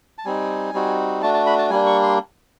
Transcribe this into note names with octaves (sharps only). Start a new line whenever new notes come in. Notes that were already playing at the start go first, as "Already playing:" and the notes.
A5
G3 C4 D#4 G#5
G3 C4 D#4 F#4
A3 D4 F#4 A5
A5
B5
A5
G3 A#3 D4 G#5
C#6
C6